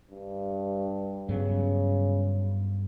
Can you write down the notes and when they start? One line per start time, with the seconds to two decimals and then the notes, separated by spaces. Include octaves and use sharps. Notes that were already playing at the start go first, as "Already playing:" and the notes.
0.11 G2
1.29 G2 C#3 F#3 B3